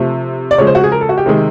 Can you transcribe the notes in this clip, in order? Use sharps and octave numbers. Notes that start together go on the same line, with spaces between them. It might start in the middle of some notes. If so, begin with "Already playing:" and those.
Already playing: C3 F3 A3
D5
C#3 F3 G#3 C#5
C5
F#4
G#4
A#4
A4
F#4
G4
C3 D#3 G#3